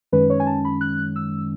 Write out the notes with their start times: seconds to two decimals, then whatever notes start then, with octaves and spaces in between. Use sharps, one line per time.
0.12 F#2 D#3 G#3 C#4 B4
0.30 C#5
0.40 G#5
0.47 A5
0.65 B5
0.81 F#6
1.16 E6